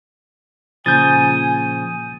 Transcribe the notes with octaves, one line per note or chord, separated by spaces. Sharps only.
A#2 C#3 F3 G#5 D#6 G6 A6